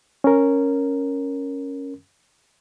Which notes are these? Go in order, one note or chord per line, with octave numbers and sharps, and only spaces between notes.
C#4 A#4